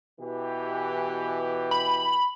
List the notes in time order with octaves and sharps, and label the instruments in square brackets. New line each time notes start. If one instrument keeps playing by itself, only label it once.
[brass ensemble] B2 E3 G4
[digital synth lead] B5